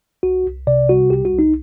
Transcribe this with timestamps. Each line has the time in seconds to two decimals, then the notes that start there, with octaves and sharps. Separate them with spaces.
0.23 C2 F#4
0.46 C2
0.67 C3 D5
0.89 G3 F#4
1.10 C2 G4
1.25 F#4
1.33 C2
1.39 D#4